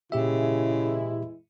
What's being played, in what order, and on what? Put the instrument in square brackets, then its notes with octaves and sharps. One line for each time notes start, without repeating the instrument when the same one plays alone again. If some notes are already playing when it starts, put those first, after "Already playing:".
[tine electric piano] A#2 G4 E5 [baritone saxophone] C#3 [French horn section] E3 G#3 E4